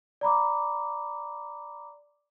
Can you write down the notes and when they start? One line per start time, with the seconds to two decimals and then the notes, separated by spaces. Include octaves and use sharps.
0.21 D5 A#5 B5 D6